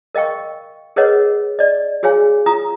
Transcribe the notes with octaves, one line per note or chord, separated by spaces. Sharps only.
A#4 D#5 F5 G5 C#6
G#4 A#4 B4 C#5 D#5 F#5
D5 D#5
F#4 G#4 C#5 F5 G#5
F4 A#5 D#6